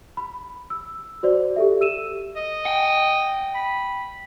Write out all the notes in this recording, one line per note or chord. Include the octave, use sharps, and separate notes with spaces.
B5
E6
F#4 C5 D5
G4 A4 E5
E6 D#7 E7
D#5
F#5 G5
B5